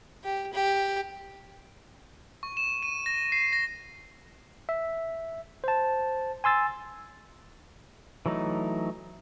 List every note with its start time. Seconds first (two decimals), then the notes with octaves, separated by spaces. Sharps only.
0.24 G4
0.53 G4
2.43 C#6
2.57 E7
2.83 D#7
3.06 A#6
3.32 C7
3.53 A#6
4.69 E5
5.64 C5 A5
6.44 G#5 C6 E6 A6
8.26 E3 F#3 A3 D#4